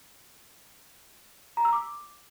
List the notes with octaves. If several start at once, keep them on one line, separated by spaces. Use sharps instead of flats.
A#5
E6
D6